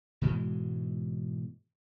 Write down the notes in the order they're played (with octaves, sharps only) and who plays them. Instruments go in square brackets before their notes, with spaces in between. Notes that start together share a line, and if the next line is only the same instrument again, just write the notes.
[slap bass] G#2 B2 E3 G#3